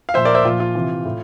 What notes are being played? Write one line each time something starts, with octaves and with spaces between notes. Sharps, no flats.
F5
A#2 F3 C5 E5
A#4 D5
C5 E5
A#2 F3 F4
F4
C3 E3
A2